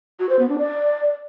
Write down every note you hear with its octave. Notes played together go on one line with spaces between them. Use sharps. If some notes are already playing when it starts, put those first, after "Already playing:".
F#4
C5
B3
D4
D5